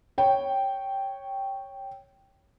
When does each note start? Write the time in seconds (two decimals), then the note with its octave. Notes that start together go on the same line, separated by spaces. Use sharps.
0.18 C#5 G5